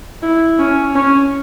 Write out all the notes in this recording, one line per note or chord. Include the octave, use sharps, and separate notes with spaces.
E4
C#4
C#4